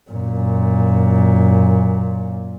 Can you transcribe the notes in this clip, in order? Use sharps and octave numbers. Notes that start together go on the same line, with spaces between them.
F#2 A#2